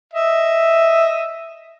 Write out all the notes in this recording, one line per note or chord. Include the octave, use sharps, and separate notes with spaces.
D#5 E5